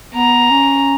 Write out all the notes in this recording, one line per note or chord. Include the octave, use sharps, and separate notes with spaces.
B3 A#5
C#4